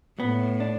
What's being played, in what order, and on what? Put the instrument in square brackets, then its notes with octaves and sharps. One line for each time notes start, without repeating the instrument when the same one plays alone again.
[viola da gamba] A2 [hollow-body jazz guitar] B3
[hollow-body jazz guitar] D4